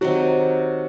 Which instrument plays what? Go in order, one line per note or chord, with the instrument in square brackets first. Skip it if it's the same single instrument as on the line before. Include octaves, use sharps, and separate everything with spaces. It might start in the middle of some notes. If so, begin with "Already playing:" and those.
[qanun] C3 D#3 F#3 [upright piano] F#4